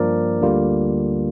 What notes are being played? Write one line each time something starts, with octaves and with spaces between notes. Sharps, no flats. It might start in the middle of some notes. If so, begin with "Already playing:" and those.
Already playing: G2 F3 A#3 A#4 D5
D2 D3 G3 A#3 F4